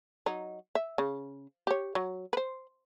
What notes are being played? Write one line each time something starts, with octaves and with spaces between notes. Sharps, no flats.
F#3 D#4
E5
C#3
G4 C#5
F#3
B4 C5